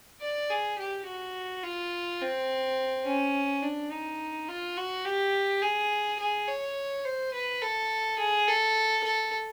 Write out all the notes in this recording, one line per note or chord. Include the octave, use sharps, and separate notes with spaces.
D5
G#4
G4
F#4
F4
C4
C#4
D4
D#4
F4
F#4
G4
G#4
G#4
C#5
C5
B4
A4
G#4
A4
A4